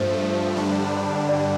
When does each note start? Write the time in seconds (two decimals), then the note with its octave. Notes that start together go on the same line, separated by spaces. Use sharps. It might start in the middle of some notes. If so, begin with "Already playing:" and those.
Already playing: G2 F3 A3 C5
0.56 G2 D3 G3 D4
1.29 D5